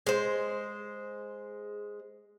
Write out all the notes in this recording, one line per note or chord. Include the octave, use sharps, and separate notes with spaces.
G#3 C5